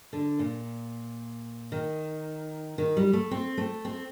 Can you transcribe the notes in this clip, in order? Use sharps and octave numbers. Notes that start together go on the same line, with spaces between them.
D3
A#2
D#3
D#3
G3
A3
C4
A3
C4